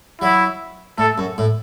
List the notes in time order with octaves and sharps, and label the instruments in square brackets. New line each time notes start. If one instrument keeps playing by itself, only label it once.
[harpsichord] F#3 [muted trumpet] E4
[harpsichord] A2 [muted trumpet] A4
[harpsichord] F#2
A2